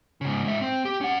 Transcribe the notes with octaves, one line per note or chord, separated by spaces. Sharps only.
G#2 C#3
G#2 E5
C4
G4
C#4 F#5